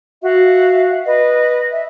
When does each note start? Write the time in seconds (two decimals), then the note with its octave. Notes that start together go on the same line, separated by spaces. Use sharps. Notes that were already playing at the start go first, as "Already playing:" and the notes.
0.23 F#4 E5 F5
1.06 B4 D#5
1.73 E5